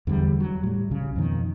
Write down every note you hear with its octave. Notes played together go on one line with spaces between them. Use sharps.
E2 D3 F#3 G3
F#3
A2 G3
C2 C#3
F2 B2 D#3